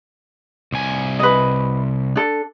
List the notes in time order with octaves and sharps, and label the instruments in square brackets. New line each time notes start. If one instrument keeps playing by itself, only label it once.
[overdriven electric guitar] C2 G#5
[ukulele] B4 D#5
D4 A4